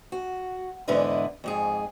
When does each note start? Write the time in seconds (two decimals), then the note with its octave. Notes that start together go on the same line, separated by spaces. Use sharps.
0.12 F#4
0.88 E2 G#2 D3 E4 B4 D#5
1.44 F2 G#2 G#4